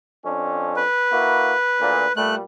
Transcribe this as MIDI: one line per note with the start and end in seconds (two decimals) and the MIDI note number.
0.24 0.84 41
0.24 0.84 61
0.24 0.84 62
0.76 2.12 71
1.12 1.54 58
1.12 1.54 64
1.12 1.54 66
1.80 2.04 38
1.80 2.04 46
2.17 2.42 46
2.17 2.42 55
2.17 2.35 57
2.17 2.35 90